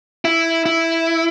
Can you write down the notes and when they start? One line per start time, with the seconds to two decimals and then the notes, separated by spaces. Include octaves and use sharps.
0.25 E4
0.66 E4